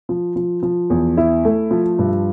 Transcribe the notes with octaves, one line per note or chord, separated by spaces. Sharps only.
F3
F3
F3
E2
E4
A3
F3
G2